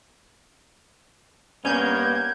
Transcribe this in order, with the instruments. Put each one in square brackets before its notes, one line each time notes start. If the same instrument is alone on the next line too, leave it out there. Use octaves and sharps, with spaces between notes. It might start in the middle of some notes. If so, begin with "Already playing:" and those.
[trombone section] G2 A#3 B3 [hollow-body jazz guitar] C#4 [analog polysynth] G6 G#6